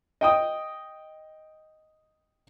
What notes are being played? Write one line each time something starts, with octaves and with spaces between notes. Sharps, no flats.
D#5 G5 D#6